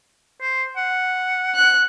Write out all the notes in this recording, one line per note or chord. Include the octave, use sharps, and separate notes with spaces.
C5
F#5
F#6